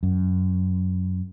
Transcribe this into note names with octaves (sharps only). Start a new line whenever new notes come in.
F#2